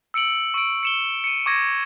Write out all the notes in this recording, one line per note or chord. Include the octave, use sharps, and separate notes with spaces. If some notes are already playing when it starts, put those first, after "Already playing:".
E6 C#7 D7 F#7
C#6 E6 D7
C#7 E7 G7
C#7 D#7
C#6 D6 G#6 A#6